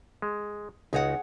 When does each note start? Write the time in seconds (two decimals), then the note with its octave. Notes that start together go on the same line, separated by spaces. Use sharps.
0.22 G#3
0.93 C#2 D#4 F#4 G#4 C#5 F#5